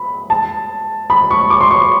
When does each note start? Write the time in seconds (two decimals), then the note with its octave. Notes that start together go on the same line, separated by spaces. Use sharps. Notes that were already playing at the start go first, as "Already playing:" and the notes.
Already playing: B5
0.30 A5
1.10 B5
1.31 C#6
1.50 D6
1.61 C6
1.71 C#6